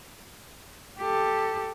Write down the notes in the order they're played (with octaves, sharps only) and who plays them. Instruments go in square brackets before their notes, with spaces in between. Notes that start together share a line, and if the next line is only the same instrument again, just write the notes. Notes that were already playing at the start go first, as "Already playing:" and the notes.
[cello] G4 A4